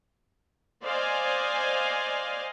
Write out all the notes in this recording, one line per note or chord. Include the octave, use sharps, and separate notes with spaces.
C5 D5 D#5 F5 G#5